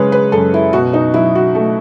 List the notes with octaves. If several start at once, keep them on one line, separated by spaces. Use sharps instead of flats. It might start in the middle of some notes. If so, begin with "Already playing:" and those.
Already playing: F#2 C#3 G#3 B4 C#5
B4
F#2 A4
E4
B2 F#4
D#4
F#3 E4
F#4
A3